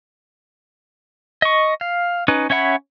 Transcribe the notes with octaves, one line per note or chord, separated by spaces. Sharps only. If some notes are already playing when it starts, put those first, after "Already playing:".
D#5 C#6
F5
C#4 D#4 B4
C#4 C#5 E5 F#5 B5